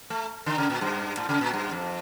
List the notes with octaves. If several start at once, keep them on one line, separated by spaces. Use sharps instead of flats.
A3
D3
C#3
A#2
G2
A2
C#3
A#2
G2
F2